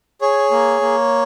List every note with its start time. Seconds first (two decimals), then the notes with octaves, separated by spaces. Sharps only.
0.22 G#4 C#5
0.51 A#3
0.81 A#3